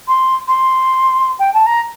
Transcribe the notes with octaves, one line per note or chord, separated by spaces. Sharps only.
C6
C6
G5
A5
A#5